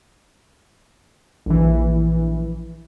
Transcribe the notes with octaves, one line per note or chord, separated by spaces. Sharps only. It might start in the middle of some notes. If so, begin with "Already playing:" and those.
A#1 E3